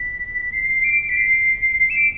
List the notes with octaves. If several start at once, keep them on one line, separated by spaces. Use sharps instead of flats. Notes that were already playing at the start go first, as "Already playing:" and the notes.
Already playing: B6
C7
D7
B6
C7
C7
E7
D7